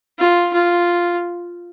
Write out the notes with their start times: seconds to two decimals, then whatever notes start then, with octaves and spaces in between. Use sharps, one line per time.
0.19 F4
0.53 F4